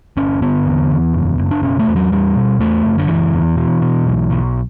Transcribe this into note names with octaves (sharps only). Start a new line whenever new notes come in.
G1 C#4
D3 B3
E2
E2
F#1
F#1
D4
B2 C#4
A3
E2
F#3
E2 G3
B2
E2 A3
F#1
D3
F#1 E3
E2
B2
B2
B1
B1